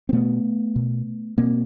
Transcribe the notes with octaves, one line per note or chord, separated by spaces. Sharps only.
C4
B2 A3 B3
B2
B2 A#3 C4